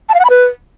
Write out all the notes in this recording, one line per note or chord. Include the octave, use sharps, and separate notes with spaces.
A5
F5
F#5
B5
B4